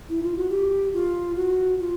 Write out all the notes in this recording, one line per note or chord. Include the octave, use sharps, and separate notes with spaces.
E4
F4
F#4
G4
F4
F#4
F4